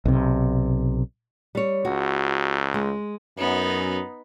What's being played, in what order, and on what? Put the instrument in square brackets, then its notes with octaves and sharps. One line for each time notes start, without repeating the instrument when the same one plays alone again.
[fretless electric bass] B1 C3
[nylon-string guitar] G3 C#5
[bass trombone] C#2 [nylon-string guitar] F#4
[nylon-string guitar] G#3
[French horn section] F#2 [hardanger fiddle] B3 D#4